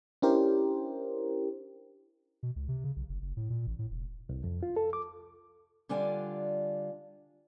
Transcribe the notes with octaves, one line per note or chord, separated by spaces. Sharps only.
C#4 D4 E4 G4 A#4 C5
B2
C#2
C3
C#3
B1
F#1
F#1
A2
A#2
A1
A2
E1
C2
F2
F4
A4
D6
D3 G3 D4 F4 G#5